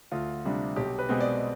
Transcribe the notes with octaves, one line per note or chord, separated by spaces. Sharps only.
D2 F4
C3 G3 D4
B1 G4
B4
B2 G#3 C4
D5